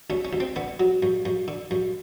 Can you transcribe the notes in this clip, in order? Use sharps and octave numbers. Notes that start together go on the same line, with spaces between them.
D2 C#4
C#4
D2
C4
D3 B3
F#3
F#2
F#2
D3
F#2